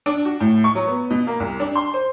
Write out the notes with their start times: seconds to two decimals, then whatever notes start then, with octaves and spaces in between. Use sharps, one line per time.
0.06 D4
0.25 F#4
0.40 A2
0.64 C#6
0.75 F#3
0.87 B3
1.10 B2
1.27 A#3
1.40 C2
1.60 D4
1.75 C6
1.94 C5